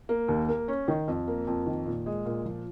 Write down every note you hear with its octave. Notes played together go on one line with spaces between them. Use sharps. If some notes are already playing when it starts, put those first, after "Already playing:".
A#3
D#2
A#3
C#4
D#3
F2
A#3
F2
D#3
A#2
G#3
A#2
F3